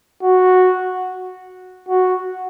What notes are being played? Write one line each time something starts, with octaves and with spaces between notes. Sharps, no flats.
F#4
F#4